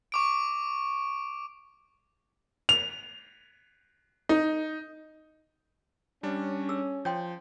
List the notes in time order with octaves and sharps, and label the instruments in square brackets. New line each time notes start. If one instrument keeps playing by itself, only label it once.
[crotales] C#6 D6 D7
[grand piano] F7
[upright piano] D#4
[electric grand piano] G3 D4 [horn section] C#4
[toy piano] G#4 E6
[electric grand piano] F3 [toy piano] C#5 G5 C6